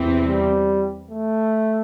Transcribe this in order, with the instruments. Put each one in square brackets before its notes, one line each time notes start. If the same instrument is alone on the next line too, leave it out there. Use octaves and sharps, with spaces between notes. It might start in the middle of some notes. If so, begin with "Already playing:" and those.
Already playing: [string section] E2 C3 E3 C4
[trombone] G3
A3